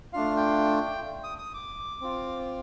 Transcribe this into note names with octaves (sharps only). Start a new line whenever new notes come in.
A3 D4 F4 F5
G5
D#6
D#6
D6
C4 F4